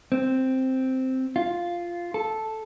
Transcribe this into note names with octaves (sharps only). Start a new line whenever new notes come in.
C4
F4
A4